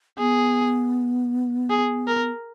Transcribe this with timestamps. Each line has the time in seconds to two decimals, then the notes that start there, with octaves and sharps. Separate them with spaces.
0.18 B3 G#4
1.70 G#4
2.07 A#4